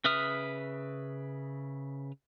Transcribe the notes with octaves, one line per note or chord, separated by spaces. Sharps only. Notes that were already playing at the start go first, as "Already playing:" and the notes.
C#3 B4 E5 D#6 F6